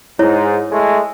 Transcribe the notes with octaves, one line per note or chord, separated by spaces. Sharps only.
G#2 E4 C#5
G#3 A3